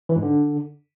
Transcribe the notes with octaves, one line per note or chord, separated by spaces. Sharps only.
E3
G#2
D3